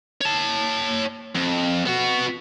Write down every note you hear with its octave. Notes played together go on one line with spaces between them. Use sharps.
C#5 A5
F2
B3 F#4